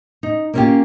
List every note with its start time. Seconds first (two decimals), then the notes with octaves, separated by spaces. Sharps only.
0.23 D#4
0.54 A#3 C4 C#4 E4 F4 G4